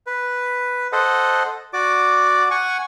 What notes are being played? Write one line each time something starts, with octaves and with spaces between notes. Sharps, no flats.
B4
A4 C5 D#5 F#5
F#4 D5 D6
F#5 G#5 C#6